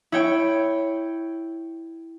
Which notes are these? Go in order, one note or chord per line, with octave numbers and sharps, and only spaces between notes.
E4 C#5 G5